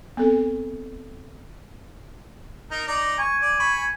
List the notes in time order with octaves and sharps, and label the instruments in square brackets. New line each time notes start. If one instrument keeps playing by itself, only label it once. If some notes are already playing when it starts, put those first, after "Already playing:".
[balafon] B3 C4 A4
[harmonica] D#4 A#4
D#4 D5 A#5
[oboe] G#5 [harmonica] C#6
[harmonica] D5
B5 C#6